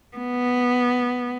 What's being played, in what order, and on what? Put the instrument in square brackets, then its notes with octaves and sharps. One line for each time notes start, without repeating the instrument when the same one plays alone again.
[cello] B3